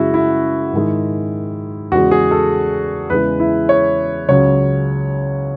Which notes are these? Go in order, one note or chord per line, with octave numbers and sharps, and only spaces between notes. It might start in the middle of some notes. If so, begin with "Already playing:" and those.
Already playing: F#2 C#3 G#3 E4 F#4
E4
G#2 D#3 G#3
E2 C#3 G#3 F#4
G#4
A4
E2 C#3 E3 G#3 B4
E4
C#5
C#2 C#3 F#3 C#5